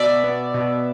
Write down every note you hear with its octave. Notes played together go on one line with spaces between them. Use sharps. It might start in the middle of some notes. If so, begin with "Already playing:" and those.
Already playing: B2 D5 E5
B3
B2